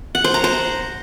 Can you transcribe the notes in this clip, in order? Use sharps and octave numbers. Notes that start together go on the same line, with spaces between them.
F#5
C5
A#5
C5